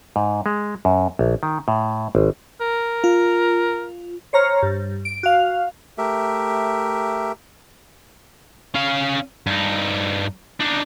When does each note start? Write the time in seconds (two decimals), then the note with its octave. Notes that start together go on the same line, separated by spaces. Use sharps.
0.16 G#2
0.46 G#3
0.85 F#2
1.19 A#1
1.43 D#3
1.68 A2
2.15 G#1
2.61 A#4
3.04 F4
4.33 C5 C#5 A#5 F6
4.63 G2
5.05 D7
5.23 F#4 F5
5.98 A3 G4 A#4 E5
8.75 C#4 F5
9.47 G2 D#4
10.60 D4 D#4